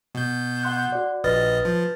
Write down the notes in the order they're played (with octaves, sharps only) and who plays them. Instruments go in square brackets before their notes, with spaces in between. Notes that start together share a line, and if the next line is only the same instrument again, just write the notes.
[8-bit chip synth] B2 G6
[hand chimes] F#5 C6 F#6
F#4 D5
[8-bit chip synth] A#1 D#5 [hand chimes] B4 F6 A6
[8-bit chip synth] F3